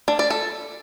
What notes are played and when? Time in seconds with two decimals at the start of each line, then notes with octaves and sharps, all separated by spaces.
0.08 D4
0.19 D5
0.30 A4